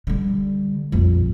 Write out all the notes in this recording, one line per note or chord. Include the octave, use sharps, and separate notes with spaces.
D3 G3
A#1 F2